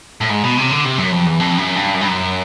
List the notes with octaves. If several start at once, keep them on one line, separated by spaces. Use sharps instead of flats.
A2
G#2
B2
C3
D3
C3
F#2
F2
E2
F2
F#2
G2
F#2
G2
F#2